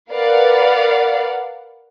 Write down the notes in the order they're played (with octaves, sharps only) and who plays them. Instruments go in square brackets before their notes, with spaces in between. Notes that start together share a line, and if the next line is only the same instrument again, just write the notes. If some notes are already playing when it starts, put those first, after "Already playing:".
[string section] A#4 B4 D5 F5 F#5